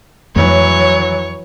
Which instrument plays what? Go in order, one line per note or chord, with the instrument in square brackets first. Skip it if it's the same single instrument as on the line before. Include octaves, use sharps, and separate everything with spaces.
[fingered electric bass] F2 A3 [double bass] E3 F#3 [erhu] C#5